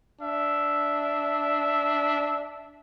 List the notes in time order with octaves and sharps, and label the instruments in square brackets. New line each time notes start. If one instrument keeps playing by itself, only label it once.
[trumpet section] D4 E5